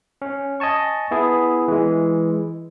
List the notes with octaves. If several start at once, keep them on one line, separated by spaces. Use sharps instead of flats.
C#4
D#5 G#5 A5 C#6
B3 E4 G#4
E3 G#3